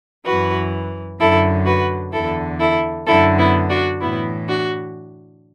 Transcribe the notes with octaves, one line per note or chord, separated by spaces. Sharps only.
F#2 E3 F#4 B4
F#2 D3 E4 A4
F#4 B4
E2 D3 E4 A4
E4 A4
F#2 D3 E4 A4
B3 E4
D4 F#4
A2 E3 B3 E4
D4 F#4